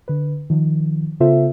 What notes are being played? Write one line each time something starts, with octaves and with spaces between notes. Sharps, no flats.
D3 B4
D#3 F3
C#3 B3 F4 A4 C5 E5